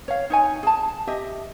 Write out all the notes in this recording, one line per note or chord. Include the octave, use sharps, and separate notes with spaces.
C#5 F5
D#4 C#5 G#5
G#4 A5
G4 D#5 E5